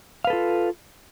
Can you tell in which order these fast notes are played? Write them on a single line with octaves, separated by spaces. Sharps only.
F5 B4 A4 F4